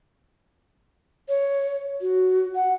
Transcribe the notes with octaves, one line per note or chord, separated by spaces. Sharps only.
C#5
F#4
F#5